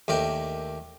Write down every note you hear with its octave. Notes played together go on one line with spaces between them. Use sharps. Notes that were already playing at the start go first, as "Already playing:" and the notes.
D#2 A3 D4 A#4 G5